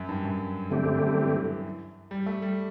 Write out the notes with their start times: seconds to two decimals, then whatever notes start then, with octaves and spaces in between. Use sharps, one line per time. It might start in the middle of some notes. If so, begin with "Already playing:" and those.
Already playing: F#2
0.09 G2
0.25 F#2
0.70 G2 D3 A3 C4 G4
0.83 F#2
0.94 F#2
1.07 G2
1.18 E3
2.11 G3
2.26 A3
2.42 G3